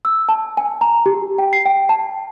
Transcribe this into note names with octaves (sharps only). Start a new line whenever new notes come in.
E6
A5
G#5
A#5
G4
G5
C7
G5
A5